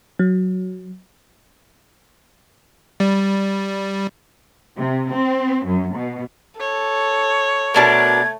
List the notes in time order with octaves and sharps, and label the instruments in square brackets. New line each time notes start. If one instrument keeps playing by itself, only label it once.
[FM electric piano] F#3
[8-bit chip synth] G3
[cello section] C3
C4
F#2
B2
[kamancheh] A4 [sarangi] C#5
[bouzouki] B2 D4 A#4 [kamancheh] A3 [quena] G#6